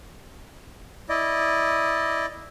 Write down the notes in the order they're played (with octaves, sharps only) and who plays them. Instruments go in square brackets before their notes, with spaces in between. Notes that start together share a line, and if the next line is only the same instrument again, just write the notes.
[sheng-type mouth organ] E4 D5 D#5